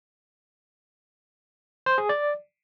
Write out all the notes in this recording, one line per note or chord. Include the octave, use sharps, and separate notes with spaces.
C5
G#4
D5